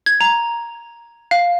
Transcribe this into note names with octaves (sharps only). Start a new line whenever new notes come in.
G#6
A#5
F5